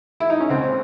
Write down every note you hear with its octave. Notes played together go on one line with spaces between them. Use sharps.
E4
D#4
C#4
C#2 C4